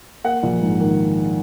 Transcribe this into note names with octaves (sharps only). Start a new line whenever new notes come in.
A#3 F#5
A#1
G#2
D#3